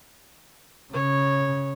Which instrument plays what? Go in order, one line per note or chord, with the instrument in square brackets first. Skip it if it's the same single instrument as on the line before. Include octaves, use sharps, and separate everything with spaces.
[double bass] C#3 [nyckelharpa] C#5